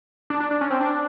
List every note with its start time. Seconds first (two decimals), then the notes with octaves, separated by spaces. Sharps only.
0.30 D4
0.40 D4
0.51 D4
0.61 C#4
0.70 C4
0.81 D4